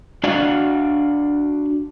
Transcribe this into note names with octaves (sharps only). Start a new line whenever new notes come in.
D4 F#4 D5 F5 F#5